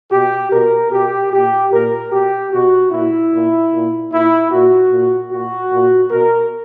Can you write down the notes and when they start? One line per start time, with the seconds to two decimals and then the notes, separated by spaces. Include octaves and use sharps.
0.11 B2 G4
0.51 B2 A#4
0.91 B2 G4
1.31 A#2 G4
1.70 A#2 A#4
2.11 B2 G4
2.50 B2 F#4
2.91 A#2 E4
3.30 A#2
3.70 A#2
4.10 A#2 E4
4.50 A#2 F#4
4.90 A#2
5.30 A#2 F#4
5.70 A#2
6.09 B2 A#4